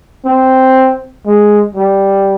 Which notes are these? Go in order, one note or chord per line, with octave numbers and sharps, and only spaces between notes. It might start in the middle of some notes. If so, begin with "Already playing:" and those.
C4
G#3
G3